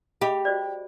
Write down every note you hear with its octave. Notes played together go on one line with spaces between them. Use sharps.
G4 G#4 D#5 B5
F#4 C5 D5